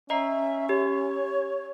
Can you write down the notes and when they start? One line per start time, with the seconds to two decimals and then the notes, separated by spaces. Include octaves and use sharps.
0.10 C#4 D#5 E5 A#5 C7
0.69 G4 C#5